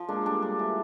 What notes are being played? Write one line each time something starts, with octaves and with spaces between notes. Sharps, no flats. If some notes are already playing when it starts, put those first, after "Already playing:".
Already playing: F3
G#3 A#3 D4
G3 A3 D4
D4
E3